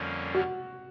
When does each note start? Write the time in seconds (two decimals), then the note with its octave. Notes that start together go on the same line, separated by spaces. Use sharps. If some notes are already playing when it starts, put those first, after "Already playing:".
Already playing: F2 D3 G3 A#3 C#4
0.34 F#4